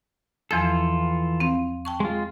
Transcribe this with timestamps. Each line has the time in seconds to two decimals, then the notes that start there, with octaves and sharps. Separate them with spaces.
0.51 E2 E3 F3 F4 A4 A6
1.40 C4 F5
1.85 G5 A5 C#6
2.00 G#3 F4